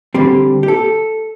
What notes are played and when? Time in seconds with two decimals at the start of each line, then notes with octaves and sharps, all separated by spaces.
0.14 D3 G3 C4 G4
0.63 G4
0.68 A4